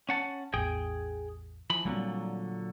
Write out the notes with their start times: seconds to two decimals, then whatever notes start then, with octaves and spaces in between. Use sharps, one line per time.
0.09 C#4 F#5 A5
0.54 A1 E2 G#4 G5
1.70 E3 F3 B5
1.85 A#2 D3 F#3 G3 A#3 C4